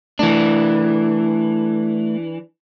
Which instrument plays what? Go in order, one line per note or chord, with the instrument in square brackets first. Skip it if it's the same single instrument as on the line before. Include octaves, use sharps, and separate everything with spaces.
[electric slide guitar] E3 D4 [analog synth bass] A3